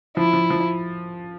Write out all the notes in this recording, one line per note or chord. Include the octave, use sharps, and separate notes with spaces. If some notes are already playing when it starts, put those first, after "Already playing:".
F3 E4
F3
F3